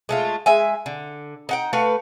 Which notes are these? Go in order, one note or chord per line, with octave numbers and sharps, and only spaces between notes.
G#3 A3 F4
G#3 E5 G#5
D3
D#4 F#5 G5
A3 F#4 B4 F5